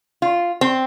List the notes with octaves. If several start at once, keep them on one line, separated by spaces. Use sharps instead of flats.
F4
C4